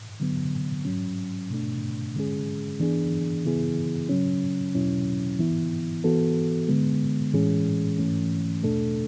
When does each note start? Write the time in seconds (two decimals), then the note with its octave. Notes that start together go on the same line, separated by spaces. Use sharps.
0.20 D3 F#3 B3
0.85 G#2 F#3 C#4
1.50 B2 A3 D4
2.16 D3 G#3 C#4 G#4
2.80 E3 B3 D4 G#4
3.45 C#3 E3 B3 E4 G#4
4.09 C#3 F#3 C#4
4.75 E2 B2 F#3 C#4 E4
5.39 E3 B3 E4
6.04 E3 B3 F#4 A4
6.69 D3 G#3 B3
7.33 A2 E3 G#3 C#4 G#4
7.99 G#2 E3 A3 C#4
8.63 E2 B2 A3 D4 A4